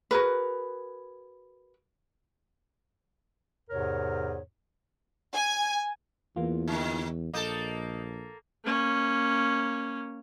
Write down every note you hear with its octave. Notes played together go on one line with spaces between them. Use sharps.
F#4 G#4 A#4 B4
E2 G#2 C3 A#4 C#5
G#5
E2 E3 A#3 F4
D3 D#3
A#1 A#3 A4 D#5 D#6 G6
A#3 C#4